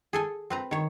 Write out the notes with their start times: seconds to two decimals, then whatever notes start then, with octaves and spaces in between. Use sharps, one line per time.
0.13 G#4 A4 G#5
0.50 C4 B4 A#5
0.71 D#3 C#5